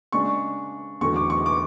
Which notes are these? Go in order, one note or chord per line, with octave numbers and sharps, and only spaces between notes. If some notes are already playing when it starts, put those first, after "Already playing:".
C#3 G#3 D4 C#6
E2 D3 F#3 A3 C#6
D6
C#6
D6